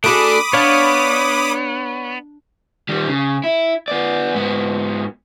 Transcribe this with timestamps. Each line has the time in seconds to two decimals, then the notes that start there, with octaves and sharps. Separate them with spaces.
0.04 A3 D4 F#4 G#4 B5 D6 D#6
0.53 B3 D4 C#5 F5
2.89 D#3 G3
3.08 C#3
3.44 E4
3.88 B3 D5
4.35 G#2 B3